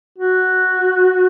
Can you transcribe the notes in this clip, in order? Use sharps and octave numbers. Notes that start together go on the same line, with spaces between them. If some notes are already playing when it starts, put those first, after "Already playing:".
F#4